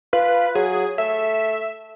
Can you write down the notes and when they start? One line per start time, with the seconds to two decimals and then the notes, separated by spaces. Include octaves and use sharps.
0.13 F4 B4
0.55 F#3 G#4
0.98 A3 E5